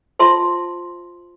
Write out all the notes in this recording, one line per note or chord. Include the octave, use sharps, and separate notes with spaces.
F4 C5 E5 A5 C6